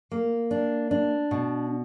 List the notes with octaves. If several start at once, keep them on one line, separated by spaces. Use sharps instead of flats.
A#3
D4
D4
B2